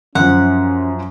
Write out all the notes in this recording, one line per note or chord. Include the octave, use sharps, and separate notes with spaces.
F#2 F3 C#4 F#5